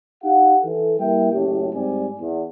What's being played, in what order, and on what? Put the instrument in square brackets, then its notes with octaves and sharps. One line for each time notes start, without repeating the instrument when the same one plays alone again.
[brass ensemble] D#4 G4 F5 F#5
E3 A4
G3 A#3 E4 E5 G5
F#1 A2 C#4 G4
G#2 G3 C4 D5 G#5
E2